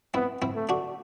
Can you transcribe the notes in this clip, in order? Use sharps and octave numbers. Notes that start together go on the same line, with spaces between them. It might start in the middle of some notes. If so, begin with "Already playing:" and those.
B3 C4 E4
C4 E4
A3
D4 F#4